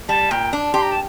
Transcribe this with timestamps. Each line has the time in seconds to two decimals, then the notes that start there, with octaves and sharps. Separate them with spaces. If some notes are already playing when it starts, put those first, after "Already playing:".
0.09 G3 A5
0.31 A#2 G5
0.53 D4
0.74 G4 C6
0.82 A#5
0.92 A5